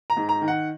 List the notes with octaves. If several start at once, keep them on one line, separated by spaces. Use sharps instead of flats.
A#5
G#2
A#5
D#3
F#5